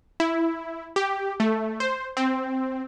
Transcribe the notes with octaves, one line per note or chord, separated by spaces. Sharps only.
E4
G4
A3
C5
C4